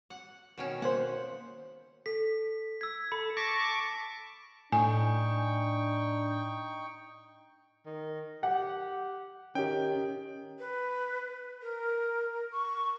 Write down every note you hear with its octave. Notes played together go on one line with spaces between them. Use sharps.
F#5
B2 D#3 C#4
A#3 C5 F#5
A4 B6
E6 G#6 B6
A4 B5
A5 C#6 D6 A#6 B6
A2 D4 D#4 G5 G#5 C#6
D#3
G4 F#5
D#3 C#4 G4 G5
B4
A#4
C#6